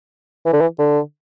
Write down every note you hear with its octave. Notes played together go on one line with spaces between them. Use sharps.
E3
D3
E3
D3